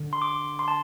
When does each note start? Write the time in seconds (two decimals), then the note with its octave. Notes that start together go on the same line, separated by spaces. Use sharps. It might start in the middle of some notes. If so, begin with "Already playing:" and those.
Already playing: D3
0.13 C6
0.22 D6
0.59 C6
0.68 A5